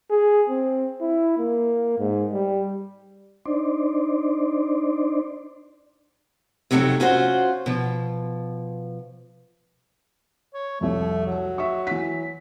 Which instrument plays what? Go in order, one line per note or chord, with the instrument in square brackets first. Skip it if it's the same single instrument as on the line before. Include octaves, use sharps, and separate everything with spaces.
[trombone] G#4
C4
E4
A#3
G#2
G3
[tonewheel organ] D4 D#4 C5 D5
[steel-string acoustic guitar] F2 C3 F#3 G#3 A3 D#4
C#4 F4 F#4 C5
B2 F3
[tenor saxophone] C#5
[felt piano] C2 F2 [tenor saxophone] A3
[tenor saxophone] F#3
[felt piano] E5 C#6
E3 B6